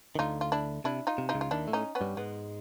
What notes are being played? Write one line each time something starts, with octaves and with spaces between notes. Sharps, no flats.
D#3
D2 D3 D#4 F4
F4
D4 E4
C3 D4 E4
D#4 F4
C3
D#4 F4
C#2 C#3
F4
D#2 D#3 D4 E4
A2 A3
C#4 D#4
B3 C#4
G2 G3
G#2 G#3 B3